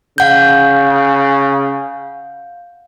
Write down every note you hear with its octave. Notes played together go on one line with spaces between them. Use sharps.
C#3 F5 F#5 G6